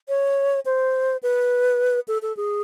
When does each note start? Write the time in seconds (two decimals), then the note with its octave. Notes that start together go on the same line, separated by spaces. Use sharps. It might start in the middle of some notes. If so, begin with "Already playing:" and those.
0.08 C#5
0.65 C5
1.23 B4
2.08 A4
2.22 A4
2.37 G#4